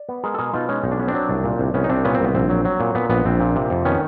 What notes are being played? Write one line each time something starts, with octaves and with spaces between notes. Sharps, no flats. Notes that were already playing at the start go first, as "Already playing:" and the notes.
Already playing: D5
B3
G#3 G#4 A#4
A4
B2 G#4 A#4
B2 D#4 F4
G#3 C#4 D#4
B1 D#4
D4
B3 C#4
C4 D4
F#3
C2
A#2
C2
C2 B3 C#4
D#4
C2 C4 D4
A#2 B3 C#4
C4
C2 B3
A#1 C4
F#3
F#3
A#2
A#2 B3
A#1 B3
A#1 C4
A#2
C3
F2
D#3 B3 C#4